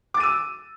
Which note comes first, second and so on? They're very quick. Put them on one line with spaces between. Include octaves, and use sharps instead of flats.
D6 A6 D#7 E6